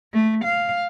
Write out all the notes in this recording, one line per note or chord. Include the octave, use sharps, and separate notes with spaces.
A3
F5